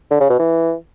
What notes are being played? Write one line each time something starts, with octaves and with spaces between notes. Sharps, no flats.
D3
C#3
B2
E3